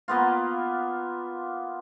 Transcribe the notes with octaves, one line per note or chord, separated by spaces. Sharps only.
A#3 B3 F4